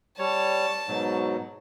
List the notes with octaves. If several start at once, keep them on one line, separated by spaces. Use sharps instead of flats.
G3 C#5 A5
G#2 B2 F#3